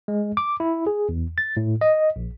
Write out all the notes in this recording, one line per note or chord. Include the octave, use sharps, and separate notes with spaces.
G#3
D6
E4
G#4
E2
A6
A2
D#5
A#1